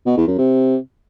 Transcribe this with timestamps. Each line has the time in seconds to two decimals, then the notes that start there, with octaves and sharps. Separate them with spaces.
0.06 B2
0.17 E2
0.28 F#2
0.38 C3